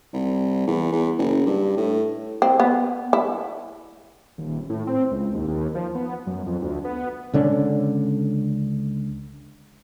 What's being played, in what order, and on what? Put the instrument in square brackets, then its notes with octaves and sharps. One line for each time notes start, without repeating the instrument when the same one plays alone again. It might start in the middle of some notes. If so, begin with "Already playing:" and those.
[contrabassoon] C2
E2
E2
F#1
G2
A2
[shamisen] C4
B3
E4
[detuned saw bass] D#1
A2
C4
C#2
D#2
D#2
F3
B3
F#2
F2
D2
B3
[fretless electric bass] C#2 D3 C#4 D4